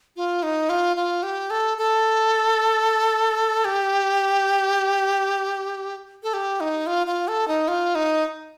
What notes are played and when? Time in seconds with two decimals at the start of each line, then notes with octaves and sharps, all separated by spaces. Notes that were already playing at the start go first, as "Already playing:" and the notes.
0.16 F4
0.43 D#4
0.69 F4
0.96 F4
1.23 G4
1.50 A4
1.78 A4
3.65 G4
6.23 A4
6.33 G4
6.60 D#4
6.87 F4
7.07 F4
7.28 A4
7.48 D#4
7.68 F4
7.95 D#4